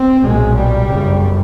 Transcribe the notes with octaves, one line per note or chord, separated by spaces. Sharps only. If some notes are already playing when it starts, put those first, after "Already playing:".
Already playing: C4
B1 A#2 G#3
G3
G1 F#2 C#3